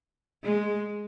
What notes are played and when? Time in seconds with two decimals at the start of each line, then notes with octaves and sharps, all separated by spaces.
0.43 G#3